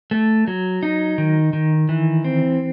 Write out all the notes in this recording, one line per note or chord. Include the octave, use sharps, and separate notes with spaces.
A3
F#3
D#4
D#3
D#3
E3
C4